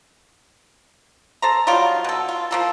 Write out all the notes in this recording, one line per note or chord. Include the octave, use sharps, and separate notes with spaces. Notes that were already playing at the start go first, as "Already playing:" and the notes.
A4 C5 A#5
F#3 G3 D#4 F4
B2 A4
F4
F3 A#3 A4